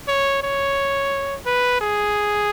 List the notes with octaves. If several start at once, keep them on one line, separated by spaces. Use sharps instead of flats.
C#5
C#5
B4
G#4